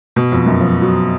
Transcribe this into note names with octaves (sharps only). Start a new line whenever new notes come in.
B2
F2
F#2
F3
F#3